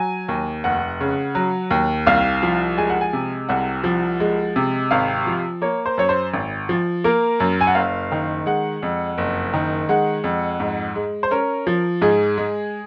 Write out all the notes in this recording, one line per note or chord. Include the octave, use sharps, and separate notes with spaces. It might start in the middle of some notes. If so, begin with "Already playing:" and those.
Already playing: F#3 G#5
D#2
F1 F#5
C#3
F#3
D#2
C2 F5
F3
G#3 G#5
F#5
G#5
C3
C2 F#5
F3
G#3
C3
G#1 F5
F3
A#3 C#5
C5
F#2 C#5
C5
G#1
F3
A#3 A#4
F#2
G#5
F#5
F#1 F5
D#3
G#3 F#5
F2
F#1
D#3
G#3 F#5
F2
G#2
G#3
C5
C#4 A#4
F3
G#2 G#4
G#3